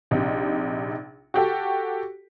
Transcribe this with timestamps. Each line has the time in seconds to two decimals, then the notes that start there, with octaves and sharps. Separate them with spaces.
0.11 A#1 C3 D#4
1.34 F#4 G4 A4